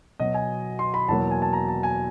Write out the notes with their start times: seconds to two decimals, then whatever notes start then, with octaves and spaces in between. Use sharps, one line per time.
0.20 B2 F#3 B3 D#5
0.34 G#5
0.79 C6
0.94 B5
1.08 E2 B2 F#3 A#3 A5
1.31 G#5
1.42 A5
1.53 A#5
1.68 A5
1.83 G#5